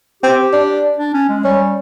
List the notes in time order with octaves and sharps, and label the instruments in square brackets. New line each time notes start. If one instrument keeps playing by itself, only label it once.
[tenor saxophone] C4 [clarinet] G4
[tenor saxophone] D4
[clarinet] D4
C#4
G#3
[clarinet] G3 [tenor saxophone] C#4